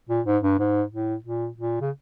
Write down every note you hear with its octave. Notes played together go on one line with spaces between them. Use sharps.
A#2
G#2
G2
G#2
A2
A#2
A#2
C#3